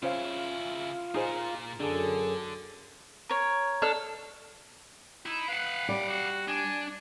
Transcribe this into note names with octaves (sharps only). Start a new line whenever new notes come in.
C#3 C#4 E4 F4 C5 F5
A#2 D#4 G#4 C5
F#2 D3 D4 G#4 A4
A#4 C#5
D4 A4 F6
D#4 E4
B4 F5 F#5
G3 D6
F#4
D4 G#5